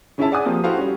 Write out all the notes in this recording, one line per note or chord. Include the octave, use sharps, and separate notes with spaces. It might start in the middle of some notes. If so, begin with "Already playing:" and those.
C#3 C#4 E4 G#4 E5 A5
G#4 D5 F#5 G#5 D#6
F3 A#3 C4 G4
E4 F#4 G4 A4 C5 F5
G3 C#4